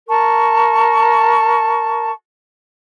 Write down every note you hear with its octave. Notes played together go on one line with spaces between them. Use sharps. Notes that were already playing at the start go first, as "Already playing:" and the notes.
A#4 A5 C#6